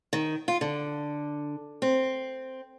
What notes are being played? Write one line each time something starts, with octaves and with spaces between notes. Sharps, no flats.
D#3
F4
D3
C4